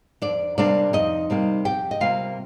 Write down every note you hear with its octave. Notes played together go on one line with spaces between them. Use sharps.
F2 D4 D5
C3 G3 A#3 D4 D5
F2 D#4 D#5
C3 G3 A#3
F2 G4 G5
D#5
C3 G3 A#3 F4 F5